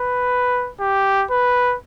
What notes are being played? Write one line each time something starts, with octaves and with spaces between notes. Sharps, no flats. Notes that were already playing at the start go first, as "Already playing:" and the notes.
Already playing: B4
G4
B4